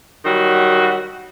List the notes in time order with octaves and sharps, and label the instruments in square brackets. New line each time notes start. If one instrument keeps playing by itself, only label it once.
[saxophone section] D#3 F#3 G3 F#4